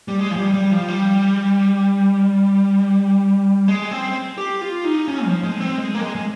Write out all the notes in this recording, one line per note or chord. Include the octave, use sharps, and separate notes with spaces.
G3
G#3
F3
G3
G3
F3
G3
G#3
C4
G4
F4
D#4
C#4
F3
G#3
C4
G#3
A#3
G#3
G#3